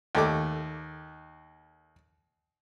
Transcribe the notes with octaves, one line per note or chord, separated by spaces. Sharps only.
D#2 A3 D6